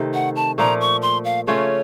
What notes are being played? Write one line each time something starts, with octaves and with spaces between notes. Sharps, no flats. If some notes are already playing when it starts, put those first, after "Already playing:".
Already playing: C3 D#3 A3
F#5
A5
A#2 F3 A3 A#5
C#6
C6
F5
C#3 A3 C#4 F4 C#5